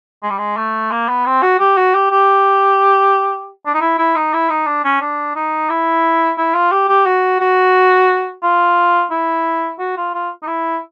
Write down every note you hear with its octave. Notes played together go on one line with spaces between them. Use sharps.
G#3
G3
G#3
A3
A#3
B3
C4
F#4
G4
F#4
G4
G4
D4
D#4
E4
E4
D#4
E4
D#4
D4
C#4
D4
D#4
E4
E4
F4
G4
G4
F#4
F#4
F4
E4
F#4
F4
F4
D#4
E4